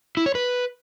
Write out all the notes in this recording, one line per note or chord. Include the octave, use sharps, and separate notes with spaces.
E4
C#5
B4